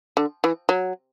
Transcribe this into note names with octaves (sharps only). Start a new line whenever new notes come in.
D3
E3
F#3